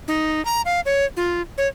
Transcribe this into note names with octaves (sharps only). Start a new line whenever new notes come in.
D#4
A#5
F5
C#5
F4
C#5